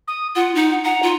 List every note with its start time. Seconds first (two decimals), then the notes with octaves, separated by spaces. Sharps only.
0.07 D#6
0.36 F4 F#5
0.55 D#4
0.84 F#5 A#5
1.03 F4